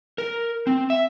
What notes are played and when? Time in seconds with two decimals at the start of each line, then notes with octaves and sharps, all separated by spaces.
0.18 A#4
0.67 C4
0.90 E5